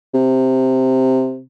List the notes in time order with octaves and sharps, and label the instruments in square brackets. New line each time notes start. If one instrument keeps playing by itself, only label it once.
[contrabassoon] C3